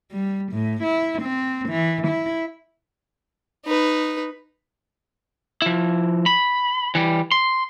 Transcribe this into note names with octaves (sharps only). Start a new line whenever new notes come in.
G3
A2
E4
C4
E3
E4
D#4 B4
F3 E4
B5
E3 G3
C6